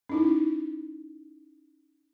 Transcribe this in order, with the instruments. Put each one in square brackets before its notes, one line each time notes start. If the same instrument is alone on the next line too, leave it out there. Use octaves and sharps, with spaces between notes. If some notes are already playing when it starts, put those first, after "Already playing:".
[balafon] C#4 D#4 E4